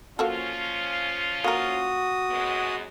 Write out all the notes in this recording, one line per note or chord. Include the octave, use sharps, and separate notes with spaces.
F3 A#3 C#4 F4 F#4 A4
A#3 F#4 A#4 D#6
F#2 G#3 B3